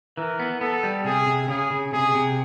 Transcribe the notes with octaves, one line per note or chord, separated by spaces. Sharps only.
E3 A#4
B3
B3 A4
G3
C3 G#4
C3
C#3 G#4
C#3
C3 G#4
C3